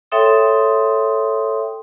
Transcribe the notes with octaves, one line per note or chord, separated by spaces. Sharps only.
A4 C#5 E5 G5 C6 D#6